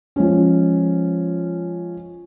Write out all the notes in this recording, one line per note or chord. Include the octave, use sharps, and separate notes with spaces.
F3 G#3 C#4